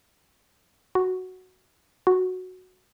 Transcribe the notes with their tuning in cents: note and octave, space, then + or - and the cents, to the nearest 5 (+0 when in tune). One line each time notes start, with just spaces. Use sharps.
F#4 +0
F#4 -5